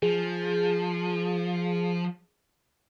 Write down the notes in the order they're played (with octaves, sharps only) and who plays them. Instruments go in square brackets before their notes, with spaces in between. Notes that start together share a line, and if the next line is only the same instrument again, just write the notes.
[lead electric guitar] F3 [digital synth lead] G#4